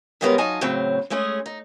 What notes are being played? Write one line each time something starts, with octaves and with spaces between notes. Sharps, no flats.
C#3 G3 G#3 B3 C#4 A#4
F#3 D#4 F4 G#5 A5
A2 C#3 F#3 C4
G#3 A3 C#4 G#4
D#4